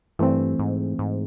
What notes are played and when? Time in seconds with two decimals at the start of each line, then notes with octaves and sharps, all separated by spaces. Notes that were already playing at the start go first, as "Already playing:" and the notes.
0.19 G2 E3 A3 C4
0.59 G#2
0.99 G#2